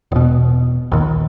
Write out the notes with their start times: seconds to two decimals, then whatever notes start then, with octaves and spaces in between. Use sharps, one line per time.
0.12 E1 B2
0.92 A#1 D#2